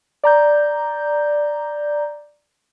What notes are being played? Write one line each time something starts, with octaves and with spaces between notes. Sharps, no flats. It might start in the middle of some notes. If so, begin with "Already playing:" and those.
D5 A#5 G6